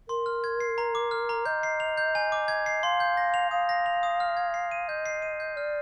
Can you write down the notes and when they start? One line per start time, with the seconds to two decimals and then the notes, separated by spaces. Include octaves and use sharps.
0.09 A#4 C6
0.26 F6
0.44 G#6
0.60 C7
0.78 A#5
0.95 D6
1.11 F6
1.29 A#5
1.45 D#5 G6
1.63 C7
1.80 F7
1.98 G6
2.15 G#5
2.32 D6
2.48 G#6
2.66 C7
2.83 F5 C6
3.00 G6
3.17 A#6
3.34 F7
3.51 F5 D#6
3.69 A#6
3.86 F7
4.03 D#6
4.20 F6
4.37 G#6
4.54 C7
4.71 D#7
4.88 D#5 G6
5.06 C7
5.22 D#7
5.40 G6
5.56 D5 F6